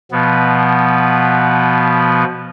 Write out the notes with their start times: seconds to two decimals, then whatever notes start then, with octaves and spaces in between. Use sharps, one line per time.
0.12 B2 F3 B3